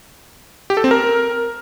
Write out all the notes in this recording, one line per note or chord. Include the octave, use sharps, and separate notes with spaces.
G4
A4
C4
A#4